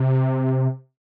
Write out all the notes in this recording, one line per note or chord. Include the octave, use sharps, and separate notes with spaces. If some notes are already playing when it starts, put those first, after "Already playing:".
Already playing: C3